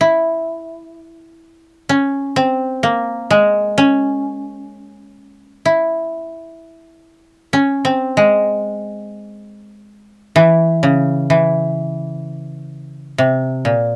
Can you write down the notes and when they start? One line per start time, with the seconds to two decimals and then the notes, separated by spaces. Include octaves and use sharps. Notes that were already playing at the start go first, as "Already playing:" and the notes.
0.01 E4
1.89 C#4
2.36 C4
2.83 A#3
3.31 G#3
3.78 C#4
5.65 E4
7.53 C#4
7.85 C4
8.17 G#3
10.36 E3
10.83 C#3
11.30 E3
13.18 C3
13.65 A#2